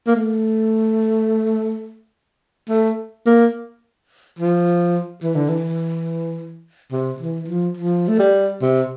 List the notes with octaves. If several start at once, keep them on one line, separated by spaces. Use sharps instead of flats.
A#3
A3
A3
A#3
F3
E3
D3
E3
C3
E3
F3
F3
A3
G3
C3